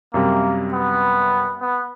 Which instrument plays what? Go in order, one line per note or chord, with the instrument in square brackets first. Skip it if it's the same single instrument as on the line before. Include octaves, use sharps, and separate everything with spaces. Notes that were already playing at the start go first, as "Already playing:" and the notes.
[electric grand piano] F#2 C3 G3 [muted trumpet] A#3
[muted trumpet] B3
B3